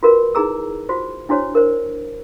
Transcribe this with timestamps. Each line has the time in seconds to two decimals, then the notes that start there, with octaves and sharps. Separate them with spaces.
0.03 F4 F#4 A#4 B4
0.35 D#4 E4 G#4 A#5 E6
0.89 F4 F#4 C5
1.29 D4 E4 F#4 C5 C#5
1.55 A#4 C5